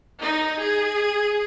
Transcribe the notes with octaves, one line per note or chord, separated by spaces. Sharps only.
D#4
G#4